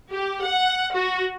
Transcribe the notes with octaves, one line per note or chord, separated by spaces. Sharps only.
G4
F#5
F#4